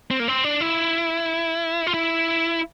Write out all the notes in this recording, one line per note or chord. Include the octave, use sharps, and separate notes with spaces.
C4
A#3
C4
D4
E4
F4
E4